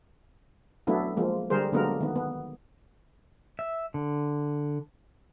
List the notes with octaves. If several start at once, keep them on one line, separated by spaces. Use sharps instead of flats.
F#3 A3 B3 D4 E4
F3 G#3 A#3
D3 G3 G#4 A#4 C5
D3 F#3 G#3 A#3 B3 A#4
D#3 B3
B3
E5
D3